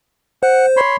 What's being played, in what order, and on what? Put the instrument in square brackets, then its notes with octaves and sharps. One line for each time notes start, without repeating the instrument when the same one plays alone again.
[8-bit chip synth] C5 [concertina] F#5
[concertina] C#5 B5 C6